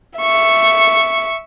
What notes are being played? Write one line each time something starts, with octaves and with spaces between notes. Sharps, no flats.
E5 C#6